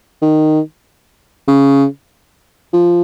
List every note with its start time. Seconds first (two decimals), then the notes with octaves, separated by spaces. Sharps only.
0.22 D#3
1.48 C#3
2.73 F3